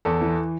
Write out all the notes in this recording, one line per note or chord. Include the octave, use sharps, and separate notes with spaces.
E2 A4
E3